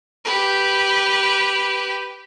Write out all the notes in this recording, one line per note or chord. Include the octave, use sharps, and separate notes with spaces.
G4 B4